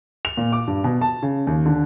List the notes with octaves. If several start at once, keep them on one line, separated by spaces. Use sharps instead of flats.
F7
A#2
D6
G2
B2
A5
C#3
D#2
D3